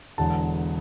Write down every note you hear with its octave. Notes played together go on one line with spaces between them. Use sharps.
E1 E2 D3 A5